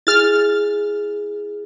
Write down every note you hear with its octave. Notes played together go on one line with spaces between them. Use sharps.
E4 G#4 F6 A6